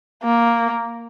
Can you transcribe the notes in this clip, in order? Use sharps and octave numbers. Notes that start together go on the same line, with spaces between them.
A#3